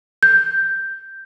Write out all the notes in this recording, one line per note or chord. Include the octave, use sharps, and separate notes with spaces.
G6